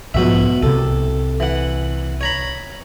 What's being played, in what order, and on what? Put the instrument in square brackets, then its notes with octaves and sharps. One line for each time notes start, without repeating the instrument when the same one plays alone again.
[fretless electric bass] B1 G#2 F3 [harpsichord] B2 F#4 E5
[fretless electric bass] C2 C3 [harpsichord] A4
[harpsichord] E3 F#5
C#5 A#5 B5